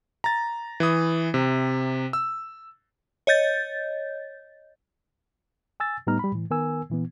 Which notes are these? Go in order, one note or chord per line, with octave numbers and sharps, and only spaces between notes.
A#5 A6
E3 D#6
C3
E6
C#5 D#5 G6 A6
G#5 E6 A6
A2 G3 B3 D#4 A#5 F6
G3 B5
A2 E3
D#3 B3 A#4 G#5 E6
A#2 E3 B3